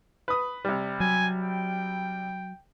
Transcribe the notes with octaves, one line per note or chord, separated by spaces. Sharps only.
B4 D#6
C3 G3
F#3 G#5
G5